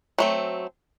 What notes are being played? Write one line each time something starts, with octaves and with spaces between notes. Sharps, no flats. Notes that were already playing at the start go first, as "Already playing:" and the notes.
F#3 A3 C4